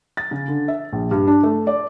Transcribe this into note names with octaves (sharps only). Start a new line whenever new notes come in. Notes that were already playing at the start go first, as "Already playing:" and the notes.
A6
C#3
D3
E5
A#1
G2
D4
A3
D5